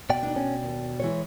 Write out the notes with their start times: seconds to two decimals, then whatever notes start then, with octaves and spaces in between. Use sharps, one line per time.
0.10 B2 D5 G5
0.23 D4 D#4
0.36 C#4
0.63 D#2
1.00 E3 G#3 C#5